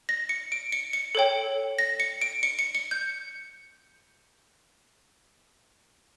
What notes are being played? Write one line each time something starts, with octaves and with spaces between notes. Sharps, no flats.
A#6
C#7
D7
C#7
C#7
A4 C#5 G5
A#6
C#7
D7
C#7
C#7
C#7
G6